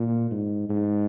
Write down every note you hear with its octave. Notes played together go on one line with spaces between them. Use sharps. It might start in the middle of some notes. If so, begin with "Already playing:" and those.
Already playing: A#2
G#2
G#2